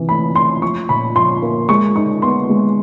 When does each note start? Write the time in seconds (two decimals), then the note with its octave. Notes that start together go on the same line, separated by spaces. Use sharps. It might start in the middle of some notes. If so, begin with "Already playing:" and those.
Already playing: C3 E3
0.09 A3 B5
0.35 A3 C6
0.62 F3 C#6
0.89 A#2 B5
1.16 F3 C6
1.42 A#3
1.69 G#3 C#6
1.96 D#4 C#6
2.22 B3 C6
2.49 G#3